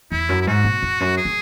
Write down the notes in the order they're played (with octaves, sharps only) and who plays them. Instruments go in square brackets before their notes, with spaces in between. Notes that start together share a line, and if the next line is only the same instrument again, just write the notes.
[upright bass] E2 [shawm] E4
[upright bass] F#2
[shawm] E4
[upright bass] G#2 [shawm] F#4
[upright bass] B2
E2
F#2
[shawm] G#4
[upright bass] C#3